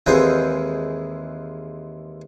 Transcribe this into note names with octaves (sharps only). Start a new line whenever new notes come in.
D#2 E3 G#3 C4 G5